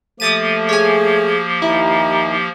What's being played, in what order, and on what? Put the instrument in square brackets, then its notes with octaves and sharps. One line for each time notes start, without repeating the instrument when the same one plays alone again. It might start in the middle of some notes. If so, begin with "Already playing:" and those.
[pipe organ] F3 A#3 G4 [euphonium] A3 [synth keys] D#6 A6 D#7
[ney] G#4 [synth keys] C#5 G#5
[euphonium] D#2 [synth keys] E4 [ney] A#5